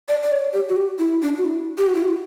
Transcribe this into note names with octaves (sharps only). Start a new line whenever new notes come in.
D5
D5
C#5
G4
F#4
G4
E4
D4
F#4
E4
G4
F#4
E4
F#4